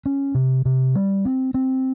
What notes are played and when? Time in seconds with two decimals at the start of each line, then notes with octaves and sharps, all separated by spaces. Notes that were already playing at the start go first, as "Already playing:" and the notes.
0.06 C#4
0.35 C3
0.65 C3
0.95 G3
1.25 C4
1.54 C4